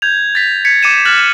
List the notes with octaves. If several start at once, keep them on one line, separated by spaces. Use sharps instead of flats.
G6 G#6 F7
A6 B6
G#6 B6 C#7
D6 C#7 D#7 E7
F6 F#6 A6 F#7